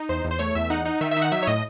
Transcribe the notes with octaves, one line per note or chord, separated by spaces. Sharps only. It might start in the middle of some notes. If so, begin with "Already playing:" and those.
Already playing: D#4
E2 C5
E2
C5
A3 C#5
E2 E5
D#4 F#5
D#4
D#3 E5
E5
D#4
F#5
F#3 E5
C#5
A2 D#5